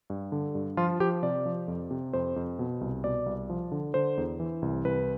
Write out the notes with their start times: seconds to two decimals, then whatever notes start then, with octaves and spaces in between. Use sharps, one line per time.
0.10 G2
0.32 D3
0.55 G2
0.77 F3 F4
1.00 F3 G4
1.22 C3 D5
1.46 F3
1.68 F2
1.91 C3
2.13 F2 C5
2.36 F2
2.59 B2
2.81 C2
3.04 B2 D5
3.26 C2
3.50 F3
3.72 D3
3.94 D3 C5
4.17 E2
4.40 E3
4.62 C2
4.85 C2 B4